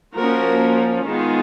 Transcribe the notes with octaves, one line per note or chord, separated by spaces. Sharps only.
F3 A#3 C#4 F#4 A#4
D#3 G#3 B3 F4 G#4